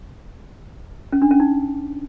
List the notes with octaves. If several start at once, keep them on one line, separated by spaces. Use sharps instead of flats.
C#4
D4
C#4
D#4